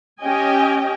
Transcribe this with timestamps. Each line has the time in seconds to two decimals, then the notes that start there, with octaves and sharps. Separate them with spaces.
0.22 C#4 G4 D#5 G5 G#5